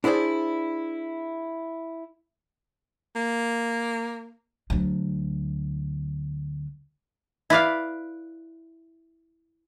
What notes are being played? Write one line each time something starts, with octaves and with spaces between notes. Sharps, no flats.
D4 E4 G#4 C5 D5
A#3
D2 F#3
E4 B4 D5 F5